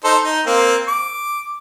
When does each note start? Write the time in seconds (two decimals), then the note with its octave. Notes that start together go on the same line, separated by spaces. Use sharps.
0.04 D#4 A4 C5
0.23 D#4
0.47 A#3 C4
0.88 D6